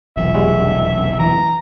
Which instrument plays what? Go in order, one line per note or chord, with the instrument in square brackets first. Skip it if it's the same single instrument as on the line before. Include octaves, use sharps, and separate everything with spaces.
[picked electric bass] F1 B1 E2 [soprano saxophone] E5
[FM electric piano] G3 G#3 F#4
[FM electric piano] E3 [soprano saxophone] A#5